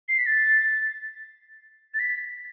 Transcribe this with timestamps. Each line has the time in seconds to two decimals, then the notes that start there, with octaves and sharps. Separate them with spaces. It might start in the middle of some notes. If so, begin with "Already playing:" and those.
0.09 C7
0.18 B6
0.26 A6
1.94 A6
1.99 B6